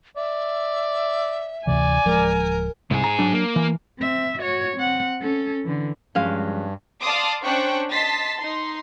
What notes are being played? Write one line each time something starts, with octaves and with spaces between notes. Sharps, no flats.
D5 E5
D2 C3 E3 D5 G#5
D1 F3 G#3 A#4
C2 G#2 G#4
A#5
F#3 D4
A#3
E3
C4 E5
F#4 C#5
C4 F#5
C#4 A4
D3 E3
G2 F3 F#3 G#3 C#4 F5
D5 F5 A5 C6 D6 D#6
C#4 D4 C5 G5 C#6 F#6
D#5 A5 C6 A6 B6 C7
D#4 C6